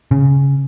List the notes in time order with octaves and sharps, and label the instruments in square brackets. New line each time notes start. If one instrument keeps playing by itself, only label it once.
[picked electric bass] C#3